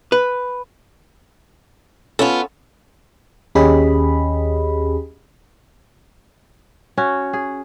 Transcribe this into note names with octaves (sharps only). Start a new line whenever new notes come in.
B4
B3 C#4 F4 A4
D#2 C#4 G4 G#4 D#5 B5
C#4 F#4
G#4